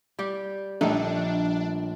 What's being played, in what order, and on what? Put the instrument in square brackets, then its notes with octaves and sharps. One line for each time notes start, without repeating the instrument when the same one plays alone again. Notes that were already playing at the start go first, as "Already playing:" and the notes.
[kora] G3 G4
[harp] A#1 G3 [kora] A3 D#4 [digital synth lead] D4